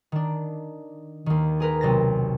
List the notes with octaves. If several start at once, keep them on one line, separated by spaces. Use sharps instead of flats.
D#3 D4
D#2 D#3
G#4 A#4 B4
B1 C3 A6 A#6